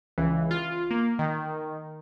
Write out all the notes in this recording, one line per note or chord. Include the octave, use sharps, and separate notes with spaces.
C#2 E3
F4
A#3
D#3